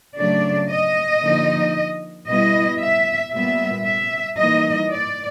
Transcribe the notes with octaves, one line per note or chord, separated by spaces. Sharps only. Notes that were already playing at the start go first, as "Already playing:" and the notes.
C#3 F#3 A3 D4 D5
D#5
D3 F3 A#3 D#4
B2 G3 B3 E4 D#5
E5
A#2 G3 B3 E5
E5
E3 G3 A#3 D#4 D#5
D5